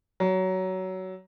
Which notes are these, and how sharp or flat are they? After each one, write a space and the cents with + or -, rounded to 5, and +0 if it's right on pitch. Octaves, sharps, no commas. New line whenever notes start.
F#3 +20